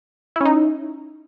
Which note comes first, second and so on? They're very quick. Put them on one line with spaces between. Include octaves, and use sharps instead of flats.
E4 C#4 D#4